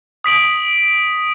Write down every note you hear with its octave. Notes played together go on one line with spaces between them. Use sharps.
D#6 B6 D7 F#7